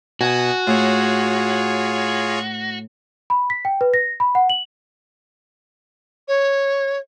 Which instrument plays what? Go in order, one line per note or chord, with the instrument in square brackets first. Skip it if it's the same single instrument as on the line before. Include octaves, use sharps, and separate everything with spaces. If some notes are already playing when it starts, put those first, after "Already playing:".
[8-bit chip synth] B2 D#6 [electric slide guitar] F#4 [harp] G#5
[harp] A2 [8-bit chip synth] F4 G#4 C#5
[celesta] B5
B6
G5
B4
A#6
B5
F#5
F#7
[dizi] C#5